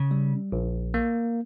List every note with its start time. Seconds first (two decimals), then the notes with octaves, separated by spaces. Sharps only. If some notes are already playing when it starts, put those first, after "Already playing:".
Already playing: C#3
0.11 G3
0.52 A#1
0.94 A#3